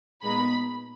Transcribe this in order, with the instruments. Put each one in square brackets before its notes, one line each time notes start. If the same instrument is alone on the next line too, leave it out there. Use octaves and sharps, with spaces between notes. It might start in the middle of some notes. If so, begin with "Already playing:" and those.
[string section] A#2 G#3 B3 D#4 B5